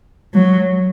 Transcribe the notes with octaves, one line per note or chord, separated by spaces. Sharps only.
F#3